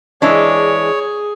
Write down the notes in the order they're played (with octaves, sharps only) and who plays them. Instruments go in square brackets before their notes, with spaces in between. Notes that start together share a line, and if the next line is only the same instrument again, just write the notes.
[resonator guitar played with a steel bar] E3 G#3 D4 [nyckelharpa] G#4 [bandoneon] C#5